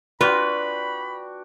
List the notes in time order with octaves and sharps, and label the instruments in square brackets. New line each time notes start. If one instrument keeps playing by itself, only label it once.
[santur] D4 F#4 G5 [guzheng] F4 [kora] B4 [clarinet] B5